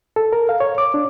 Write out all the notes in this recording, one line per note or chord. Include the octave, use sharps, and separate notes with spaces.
A4
A#4
F5
C#5
D6
D4